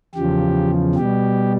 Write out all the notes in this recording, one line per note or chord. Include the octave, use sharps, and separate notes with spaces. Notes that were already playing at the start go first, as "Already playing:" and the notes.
E2 C#3 F3 G4
B2 G3 G4